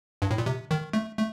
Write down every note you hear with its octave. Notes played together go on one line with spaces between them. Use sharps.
G2
A2
A#2
C3
D#3
A3
A3